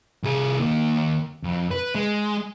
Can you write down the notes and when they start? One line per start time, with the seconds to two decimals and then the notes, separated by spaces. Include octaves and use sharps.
0.23 C2 G#4
0.59 D#3 A#3
1.44 F2
1.71 B4
1.95 G#3